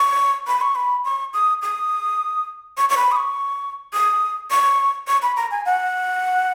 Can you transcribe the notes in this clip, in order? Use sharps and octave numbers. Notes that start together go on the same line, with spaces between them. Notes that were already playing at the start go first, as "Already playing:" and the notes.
Already playing: C#6
B5
C#6
B5
C#6
D#6
D#6
C#6
C#6
B5
D#6
C#6
D#6
C#6
C#6
B5
A#5
G#5
F#5